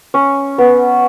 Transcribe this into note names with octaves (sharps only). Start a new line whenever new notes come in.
C#4
B3